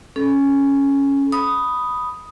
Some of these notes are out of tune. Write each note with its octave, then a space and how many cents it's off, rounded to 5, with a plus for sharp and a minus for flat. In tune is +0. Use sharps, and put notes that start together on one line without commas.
C#4 +0 A4 -30
B5 +0 D#6 +0